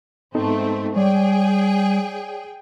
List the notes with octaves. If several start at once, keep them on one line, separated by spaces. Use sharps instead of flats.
G#2 A3 B3 C4 D#4 A4
G3 G#4 C#5 D5 G5